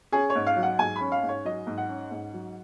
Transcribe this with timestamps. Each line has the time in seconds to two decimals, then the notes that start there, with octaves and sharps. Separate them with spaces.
0.12 C#4 G#4
0.30 C#5
0.35 G#2
0.47 F5
0.56 F#3
0.63 F#5
0.79 G#2 G#5
0.96 B5
1.01 C#4
1.12 F5
1.23 G#2
1.29 C#5
1.45 F#3 D#5
1.67 G#2
1.78 F#5
1.89 C#4
2.11 G#2
2.33 F#3